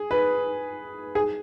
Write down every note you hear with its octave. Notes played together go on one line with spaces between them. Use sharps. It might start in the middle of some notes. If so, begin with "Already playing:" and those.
Already playing: G#4
B4
G#4